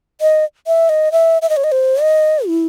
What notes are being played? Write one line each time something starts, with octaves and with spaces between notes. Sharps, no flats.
D#5
E5
D#5
E5
E5
D#5
C#5
D#5
C5
D#5
E4